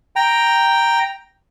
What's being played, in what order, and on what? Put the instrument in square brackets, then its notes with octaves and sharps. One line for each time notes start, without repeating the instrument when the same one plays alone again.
[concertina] G5 A#5